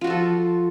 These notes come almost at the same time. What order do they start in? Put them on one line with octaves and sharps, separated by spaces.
F4 F#4 F3 A4